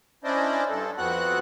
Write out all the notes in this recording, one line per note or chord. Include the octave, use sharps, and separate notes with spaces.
C#4 D4 E4 C5 D5 D#5
G2 A4
F2 B3 C4 F#4 F#5 F#6